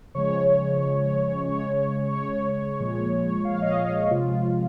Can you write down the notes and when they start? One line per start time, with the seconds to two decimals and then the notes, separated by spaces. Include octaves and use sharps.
0.15 C#3 F3 G#3 C#5
1.47 C#3 G#3 C#5
2.13 C#5
2.79 A#2 F3 G#3
3.45 F5
3.62 D#5
3.67 F5
4.11 C3 F3 G#3 F4